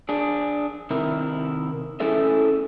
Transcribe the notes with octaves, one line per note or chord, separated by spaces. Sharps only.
D4 G#4
C3 D#3 E4 A#4
A3 C#4 E4 G#4 A4 E5